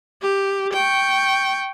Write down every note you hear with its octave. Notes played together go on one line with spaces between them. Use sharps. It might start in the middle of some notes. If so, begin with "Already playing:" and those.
G4
G5 C#6